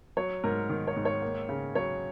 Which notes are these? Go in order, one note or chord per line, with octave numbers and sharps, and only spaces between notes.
F#3 C#5
G#2 A#4
D#3
C#5
G#2
C#5
A#3
C#3
F#3 C#5